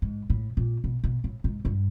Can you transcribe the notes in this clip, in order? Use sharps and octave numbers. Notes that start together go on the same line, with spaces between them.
G#2
A2
A#2
B2
B2
A2
G#2
G2